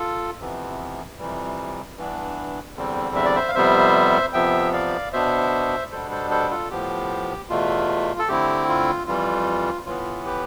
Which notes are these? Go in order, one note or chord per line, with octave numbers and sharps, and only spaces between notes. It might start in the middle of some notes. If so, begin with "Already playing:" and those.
Already playing: F4 A4
F2 C3 E3 B3
F2 C3 E3 G3
G2 E3 B3 D4
E2 D3 G3 C4
E5
D5
C5 E5
F5
F2 C3 G3 B3 C5 E5
F2 C3 F3 B3 E5 G5
D5 F5
B2 B3 D4 C5 E5
B2 G3 B3 D4 A4 C5
A4 C5
A4 C5
F4 A4
A2 F3 B3 G4
E2 B2 A3 F4
A4
D3 A3 C4 E4 G4
F4
F2 E3 G3 F4
A2 E3 B3 F4
G4 B4